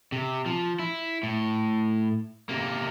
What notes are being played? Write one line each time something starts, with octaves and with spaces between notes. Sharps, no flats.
C3
F3
E4
A2
C3 A#3